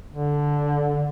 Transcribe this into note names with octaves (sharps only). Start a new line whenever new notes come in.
D3